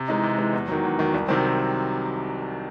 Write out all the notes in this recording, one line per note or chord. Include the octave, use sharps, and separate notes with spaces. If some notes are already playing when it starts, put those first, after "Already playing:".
Already playing: C3
E3 G#3 D#4
C3
E3 G#3 D#4
E2
D#3 F#3
E2
D#3 F#3
C2
C3 D#3 F#3 C4